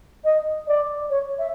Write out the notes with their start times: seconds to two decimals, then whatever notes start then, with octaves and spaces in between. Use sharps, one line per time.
0.24 D#5
0.68 D5
1.10 C#5
1.39 E5